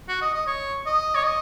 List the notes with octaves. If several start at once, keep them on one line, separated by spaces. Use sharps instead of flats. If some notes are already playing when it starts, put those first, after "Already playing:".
F#4
D#5
D#5
C#5
D#5
C#5
D#5